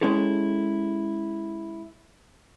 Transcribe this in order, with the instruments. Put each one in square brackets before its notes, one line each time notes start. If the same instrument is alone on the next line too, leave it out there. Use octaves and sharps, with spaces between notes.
[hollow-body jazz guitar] G#3 C#4 E4 G4 A4